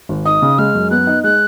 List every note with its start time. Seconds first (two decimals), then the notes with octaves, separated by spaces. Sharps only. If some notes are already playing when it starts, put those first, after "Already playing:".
0.09 G#1
0.25 D#4 D#6
0.42 C#3
0.58 G#3 F6
0.75 F#2
0.91 B3 F#6
1.07 D#4
1.24 G#3 F#6